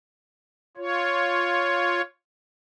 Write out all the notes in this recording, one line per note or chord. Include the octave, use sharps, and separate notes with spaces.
F4 C#5